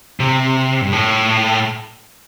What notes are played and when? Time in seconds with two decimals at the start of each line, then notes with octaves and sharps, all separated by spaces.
0.20 C3
0.81 G2
0.93 A2